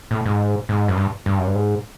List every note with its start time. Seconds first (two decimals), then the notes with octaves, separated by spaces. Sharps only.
0.11 A2
0.26 G#2
0.69 G#2
0.88 F#2
0.97 G2
1.26 G2
1.38 F#2
1.47 G2
1.55 G#2